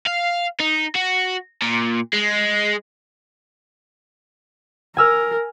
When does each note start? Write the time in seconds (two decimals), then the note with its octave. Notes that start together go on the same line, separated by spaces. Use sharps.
0.07 F5
0.60 D#4
0.95 F#4
1.62 A#2
2.13 G#3
4.97 A#4 G#5 E6 F6